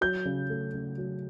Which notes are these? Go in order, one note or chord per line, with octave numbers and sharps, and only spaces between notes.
F#3 G6
C#3
A3
C#3
F#3